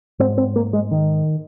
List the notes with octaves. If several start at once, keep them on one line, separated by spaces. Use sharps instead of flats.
G#2 C4
C4
A#3
G#3
D#3